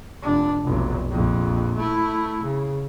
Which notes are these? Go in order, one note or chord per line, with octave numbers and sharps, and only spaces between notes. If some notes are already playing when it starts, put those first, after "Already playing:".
F1 D4
F1 B1
A#1 F2
A3 E4
C#3